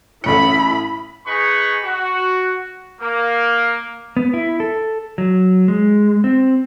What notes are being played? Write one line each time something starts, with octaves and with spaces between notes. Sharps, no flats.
A1 A2 E4 B5 C#7
D#4 G#4 B4 B5 C#6
F#4
A#3
B3
E4
A4
F#3
G#3
C4